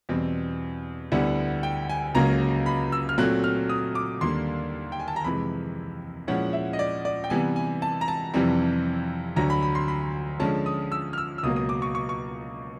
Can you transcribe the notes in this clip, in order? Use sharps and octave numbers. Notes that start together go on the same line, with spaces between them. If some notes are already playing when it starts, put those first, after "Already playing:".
E2 B2 G3 C4
D2 D3 G3 B3 E4 F#5
G5
G#5
C#2 C#3 F#3 A#3 A#5
B5
E6
F6
A#2 F#3 A3 C4 F#6
F6
D#6
D6
D#2 D3 G3 A#3 C6
G5
G#5
A5
A#5
F2 C3 E3 G#3 B5
A#2 F3 G#3 C#4 E4 F#5
E5
D#5
D5
D5
G5
C3 E3 G3 B3 G#5
G#5
A5
A#5
A5
F2 C3 E3 G3 C4
D2 D3 F#3 A#5
B5
B5
C6
B5
D3 F3 G#3 C#4 A5
D#6
E6
F6
E6
E6
C#2 B2 F#3 A#3 D#6
D#6
D6
C#6
C#6
C#6